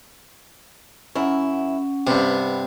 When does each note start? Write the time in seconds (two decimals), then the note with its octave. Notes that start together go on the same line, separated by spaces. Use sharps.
1.15 F#2 C#4 E4 F#5
2.07 G2 C3 B3